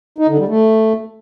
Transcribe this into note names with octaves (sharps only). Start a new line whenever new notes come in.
D#4
D3
G3
A3